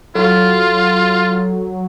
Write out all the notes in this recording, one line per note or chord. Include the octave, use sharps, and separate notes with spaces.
F#3 F4 A4